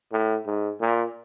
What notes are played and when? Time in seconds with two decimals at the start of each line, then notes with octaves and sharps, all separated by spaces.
0.12 A2
0.46 G#2
0.80 A#2